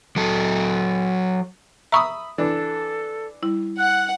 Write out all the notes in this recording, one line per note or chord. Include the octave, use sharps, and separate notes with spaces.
F#3 A4
E5 A#5 B5 C#6 D#6
E3 D4 A4
G3 E4
F#5 F#6